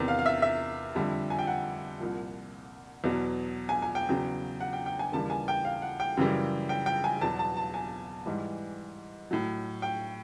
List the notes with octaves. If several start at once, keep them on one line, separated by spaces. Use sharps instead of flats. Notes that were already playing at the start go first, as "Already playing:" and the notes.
Already playing: E2 C3 D#3
F5
F5
E5
E5
F2 D3 G3
G#5
G5
F#5
C2 A#2 F3
E2 B2 F#3
G#5
G#5
G5
E2 C#3 F#3
F#5
G5
G5
G#5
D#2 C#3 E3 G3 A5
G#5
G5
F5
F#5
G5
F#2 C#3 E3 G3
G5
G5
G#5
E2 B2 F#3 A5
A5
A5
G#5
G#2 E3 G3
A2 F#3
G5